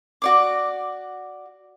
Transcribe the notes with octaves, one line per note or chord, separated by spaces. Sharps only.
F#4 D5 D6